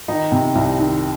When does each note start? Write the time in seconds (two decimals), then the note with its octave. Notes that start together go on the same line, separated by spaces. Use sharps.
0.08 D#3 D#4
0.32 C3
0.55 C2
0.79 D#3